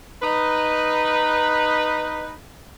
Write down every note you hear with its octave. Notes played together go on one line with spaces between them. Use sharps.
D#4 B4